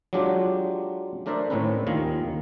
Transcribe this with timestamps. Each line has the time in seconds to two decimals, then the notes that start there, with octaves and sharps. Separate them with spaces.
0.13 F#3 G#3 D4 F4 G4
1.26 A3 D4 A#4 C5 D5 E5
1.50 A2 D#3 A3 C4 C#4 B4
1.86 D#2 D#3 F4 D#5 F5 G#5